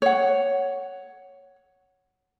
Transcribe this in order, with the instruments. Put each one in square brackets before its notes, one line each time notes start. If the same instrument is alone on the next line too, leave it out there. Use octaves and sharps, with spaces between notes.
[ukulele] C#5 F#5